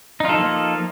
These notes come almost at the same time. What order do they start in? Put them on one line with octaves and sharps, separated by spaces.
D#4 F4 A4 F3 A#3